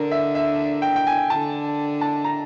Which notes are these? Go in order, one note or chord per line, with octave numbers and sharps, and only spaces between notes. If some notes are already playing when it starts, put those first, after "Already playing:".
Already playing: D3 D4 A#4
E5
E5
G5
G5
G#5
D3 D4 A5
A5
A#5